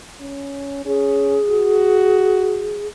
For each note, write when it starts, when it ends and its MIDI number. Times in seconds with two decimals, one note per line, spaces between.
0.20 0.81 61
0.86 1.39 61
0.86 2.87 68
1.50 2.89 66